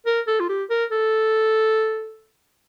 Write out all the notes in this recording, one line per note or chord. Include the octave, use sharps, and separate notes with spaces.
A#4
A4
F4
G4
A#4
A4